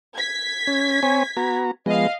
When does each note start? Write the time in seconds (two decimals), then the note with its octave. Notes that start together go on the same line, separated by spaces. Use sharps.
0.15 G#6 B6
0.67 C#4
1.03 C4 C#5 G#5
1.37 B3 F#4 A#5
1.86 F3 G#3 B3 D#5 F5